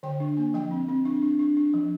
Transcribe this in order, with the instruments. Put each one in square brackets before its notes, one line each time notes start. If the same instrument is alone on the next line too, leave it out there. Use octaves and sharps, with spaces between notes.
[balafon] D3 G5
D4
A#3
F3 G5
C4
C4
D4
D4
D4
D4
F3